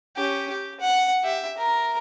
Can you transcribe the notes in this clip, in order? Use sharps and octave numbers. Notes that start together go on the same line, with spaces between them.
C#4 G4
G4
F#5
G4 E5
A#4